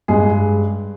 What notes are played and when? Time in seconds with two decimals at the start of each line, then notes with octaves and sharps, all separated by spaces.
0.08 G2 G#3 G#4